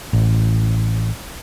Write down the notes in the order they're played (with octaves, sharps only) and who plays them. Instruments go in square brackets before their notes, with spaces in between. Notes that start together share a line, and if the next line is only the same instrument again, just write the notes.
[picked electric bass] A1